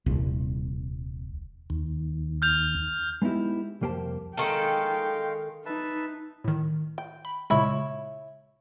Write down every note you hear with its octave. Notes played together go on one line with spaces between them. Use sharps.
D#1 C2
D#2
F6 G6 F7
G#3 B3 D#4 E4 G4
C2 F2 A#3 G4 C5 A5
D#3 G#3 A4 F5 G5
D#4 B4 E5 A5
A2 D#3
G5
B5
A#2 C#3 G#3 E4 C#5